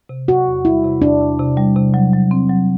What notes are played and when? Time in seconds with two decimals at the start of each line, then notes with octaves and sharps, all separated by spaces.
0.09 C3
0.28 C3 F#4
0.47 E2
0.65 G3 E4
0.84 C3
1.02 E2 D4
1.21 C3
1.39 C3
1.57 G3
1.76 C3
1.94 F#3
2.13 F#3
2.31 C4
2.50 F#3